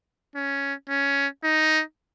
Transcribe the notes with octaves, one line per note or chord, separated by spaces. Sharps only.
C#4
C#4
D#4